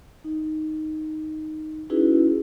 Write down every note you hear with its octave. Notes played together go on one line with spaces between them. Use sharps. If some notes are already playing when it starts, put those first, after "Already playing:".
D#4
C#4 D#4 E4 F#4 G#4 B4